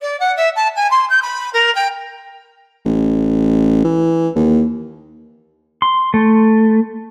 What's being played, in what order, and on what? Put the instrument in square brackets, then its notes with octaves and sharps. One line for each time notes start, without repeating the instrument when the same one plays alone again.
[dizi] D5
F#5
E5
A5
G#5
C6
G6
B5
A#4
G5
[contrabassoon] A1
E3
D#2
[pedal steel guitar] C6
A3